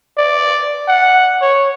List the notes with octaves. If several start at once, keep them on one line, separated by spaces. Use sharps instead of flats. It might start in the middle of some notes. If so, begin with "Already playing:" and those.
D5
F#5
C#5